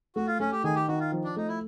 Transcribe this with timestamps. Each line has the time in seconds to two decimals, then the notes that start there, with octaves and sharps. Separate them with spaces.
0.16 A3 F#4
0.27 F4
0.40 A3 C#4
0.52 G4
0.64 D#3 G#4
0.76 G4
0.88 D#3 F#4
1.00 F4
1.12 F3
1.24 D4
1.36 A3 D#4
1.48 E4